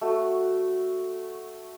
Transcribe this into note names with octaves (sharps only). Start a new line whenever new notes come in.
A3 F#4